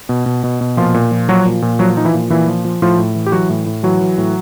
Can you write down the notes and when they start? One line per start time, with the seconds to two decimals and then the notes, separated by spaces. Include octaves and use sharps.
0.09 B2
0.26 B2
0.44 B2
0.61 B2
0.77 A#2 F3 F4
0.94 A#2
1.11 F3
1.29 F3 F#3 F#4
1.45 A#2
1.62 A#2
1.79 F3 F#3 F#4
1.97 F3 D#4
2.05 E3 E4
2.14 A#2
2.30 A#2 E3 E4
2.48 F3
2.65 F3
2.82 A2 F3 F4
2.98 A2
3.15 E3
3.26 G4
3.32 E3 F#3 F#4
3.50 A2
3.66 A2
3.83 E3 F#3 F#4
4.01 E3
4.18 A2